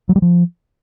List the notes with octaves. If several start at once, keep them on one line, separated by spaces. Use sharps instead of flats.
F#3
G3
F3